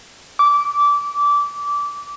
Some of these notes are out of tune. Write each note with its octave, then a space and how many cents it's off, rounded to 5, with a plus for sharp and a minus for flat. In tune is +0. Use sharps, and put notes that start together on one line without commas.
D6 -20